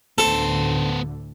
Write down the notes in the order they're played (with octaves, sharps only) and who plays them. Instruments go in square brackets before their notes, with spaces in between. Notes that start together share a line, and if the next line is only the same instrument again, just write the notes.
[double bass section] D2 A2 D3 [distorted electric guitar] B3 C5 [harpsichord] A4